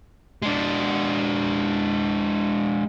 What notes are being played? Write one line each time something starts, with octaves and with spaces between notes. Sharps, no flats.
G#3 D4